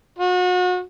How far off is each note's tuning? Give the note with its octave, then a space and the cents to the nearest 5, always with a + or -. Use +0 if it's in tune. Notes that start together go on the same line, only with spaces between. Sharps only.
F#4 -35